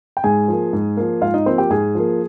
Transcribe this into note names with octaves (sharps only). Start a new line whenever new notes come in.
G5
G#2 G#4 G#5
F3 A#3
G#2
F3 A#3
G#2 F4 F5
D#4 D#5
F3 A#3 C4 C5
G4 G5
G#2 G#4 G#5
F3 A#3